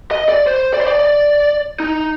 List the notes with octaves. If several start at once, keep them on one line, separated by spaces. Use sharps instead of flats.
D#5
D5
C5
D5
C5
D5
D5
D#4